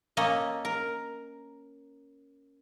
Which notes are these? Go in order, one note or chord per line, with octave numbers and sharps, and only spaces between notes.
A#3 C#4 A4 D#5
A#4